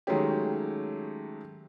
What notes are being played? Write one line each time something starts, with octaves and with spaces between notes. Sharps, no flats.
D#3 F#3 G#3 A3 C#4 G4